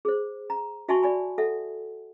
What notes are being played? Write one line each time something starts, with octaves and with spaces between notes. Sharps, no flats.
G#4 C5
A#5
F#4 E5 G#5 A5 C6 C#6
D5 G#5 B5
A4 E5 F#5